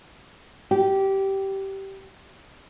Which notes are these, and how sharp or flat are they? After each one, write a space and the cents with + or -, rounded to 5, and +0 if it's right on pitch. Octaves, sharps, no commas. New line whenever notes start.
G4 -15